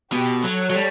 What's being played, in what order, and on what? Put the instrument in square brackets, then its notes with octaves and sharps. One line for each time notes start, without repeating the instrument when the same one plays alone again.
[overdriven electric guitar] B2 [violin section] G4
[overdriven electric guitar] F#3 [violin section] A4 C#5
[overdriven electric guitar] F#3
G3